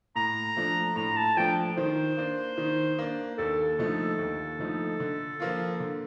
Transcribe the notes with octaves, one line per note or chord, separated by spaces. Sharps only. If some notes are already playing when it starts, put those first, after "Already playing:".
A2 A#5
F3 A3 D4
A2 A#5
A5
F3 A3 D4 G5
D#3 C5
A#3 D4
D#3
A#3 D4
D#2 A4
D3 F3 A3 D#4
D#2
D3 F3 A3 D#4
D3
F3 A#3 F4
D3